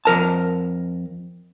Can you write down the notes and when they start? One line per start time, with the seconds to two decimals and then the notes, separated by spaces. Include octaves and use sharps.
0.05 F2 A#4 A5